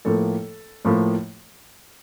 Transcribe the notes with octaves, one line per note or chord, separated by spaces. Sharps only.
A2 F3 A#3 A4
A2 F3 A#3